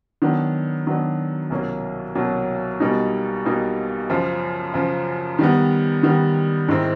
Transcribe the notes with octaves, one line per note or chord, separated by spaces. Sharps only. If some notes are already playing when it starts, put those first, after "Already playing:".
D#3 F#3 B3 D4
D#3 F#3 B3 D4
C2 B2 F#3 A#3 C#4
C2 B2 F#3 A#3 C#4
B1 B2 G3 A#3 D#4
B1 B2 G3 A#3 D#4
F#2 C#3 F3
F#2 C#3 F3
D#3 G3 B3
D#3 G3 B3
G#2 D#3 G#3 C4 E4